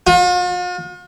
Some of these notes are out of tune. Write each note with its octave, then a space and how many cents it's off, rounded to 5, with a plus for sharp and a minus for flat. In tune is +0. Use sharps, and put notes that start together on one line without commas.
F4 +45